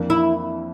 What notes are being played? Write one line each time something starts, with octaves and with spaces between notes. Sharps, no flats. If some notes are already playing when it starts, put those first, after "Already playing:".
Already playing: F2 E3 A#3 D4
E4